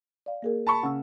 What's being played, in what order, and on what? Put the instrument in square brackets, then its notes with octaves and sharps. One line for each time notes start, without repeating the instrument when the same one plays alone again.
[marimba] D5 F5
A#3 G#4 A#4
[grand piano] A5 B5 C#6
[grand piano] C#3 [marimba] F#5 E6